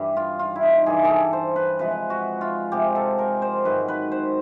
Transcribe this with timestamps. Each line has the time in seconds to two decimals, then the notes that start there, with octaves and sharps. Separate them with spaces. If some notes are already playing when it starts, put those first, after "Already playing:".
Already playing: G2 E3 G3
0.17 F4
0.39 F4
0.56 E4
0.63 D#4
0.86 G2 E3 G3 G#4
1.04 G#4
1.09 A4
1.33 C5
1.56 B4
1.79 C3 F3 G#3 B4
2.10 F#4
2.41 F4
2.72 C3 F3 G#3 G4
2.95 A4
3.18 A#4
3.42 C5
3.65 G#2 D#3 F#3 B4
3.88 B4
4.12 C5